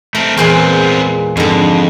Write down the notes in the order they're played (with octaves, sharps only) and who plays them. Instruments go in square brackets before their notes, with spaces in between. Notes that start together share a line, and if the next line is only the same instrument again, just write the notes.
[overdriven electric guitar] A3 C4 [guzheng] A#4
[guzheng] E2 A#2 G#3 [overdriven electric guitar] B3 C4
[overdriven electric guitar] F2 [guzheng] G#2 D3